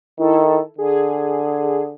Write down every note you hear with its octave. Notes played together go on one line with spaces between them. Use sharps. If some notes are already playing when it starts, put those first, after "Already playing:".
D#3 E4 A4
D3 G#4